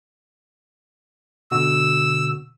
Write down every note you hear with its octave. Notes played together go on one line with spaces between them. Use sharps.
B2 D3 F#4 E6